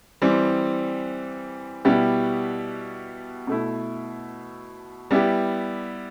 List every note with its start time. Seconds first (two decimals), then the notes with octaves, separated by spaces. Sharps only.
0.22 E3 G3 C4
1.85 B2 G3 B3 E4 G4
3.47 B2 A3 E4
5.11 G3 B3 E4 G4